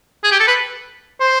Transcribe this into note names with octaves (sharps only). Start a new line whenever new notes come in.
G#4
G4
A4
B4
C5